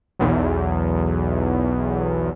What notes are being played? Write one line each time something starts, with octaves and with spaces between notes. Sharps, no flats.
B1 E2